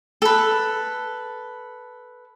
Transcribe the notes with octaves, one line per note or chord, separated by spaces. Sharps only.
A4 B4